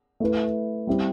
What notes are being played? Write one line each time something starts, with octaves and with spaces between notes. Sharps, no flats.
A3 E4 B4
G3 C4 E4 G4